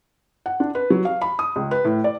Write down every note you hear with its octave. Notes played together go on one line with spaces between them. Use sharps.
F#5
D4
B4
F#3
F5
B5
D#6
C#2
B4
A2
D5